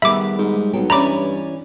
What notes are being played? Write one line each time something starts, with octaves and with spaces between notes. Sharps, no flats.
D#3 G3 B3 G#4 E5 B5 D6
G#2
B1 F#3 B3 G5
G2 E3 G3 C#4 D5 A#5 B5 D6